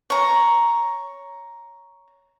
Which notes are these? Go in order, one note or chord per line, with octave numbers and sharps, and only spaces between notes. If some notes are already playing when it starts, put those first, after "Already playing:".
C#5 A#5